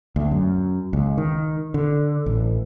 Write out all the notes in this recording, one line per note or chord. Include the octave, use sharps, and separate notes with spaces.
D2
F#2
C#2
D#3
D3
A1